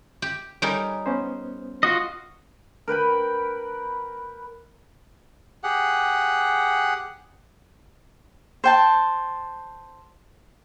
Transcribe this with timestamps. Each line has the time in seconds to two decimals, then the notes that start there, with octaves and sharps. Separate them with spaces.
0.22 G4
0.62 G3 D#4 A#4 C#5 G#5
1.06 B3 C#4 C5
1.83 F4 F#4 D#5
2.88 A#4 B4 G5 B5
5.64 G4 G#4 F#5
8.64 C5 G5 A5